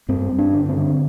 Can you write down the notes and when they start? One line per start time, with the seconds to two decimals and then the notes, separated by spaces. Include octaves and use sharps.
0.09 G2 C4
0.32 G2
0.39 D4
0.54 D3
0.69 C4
0.77 D3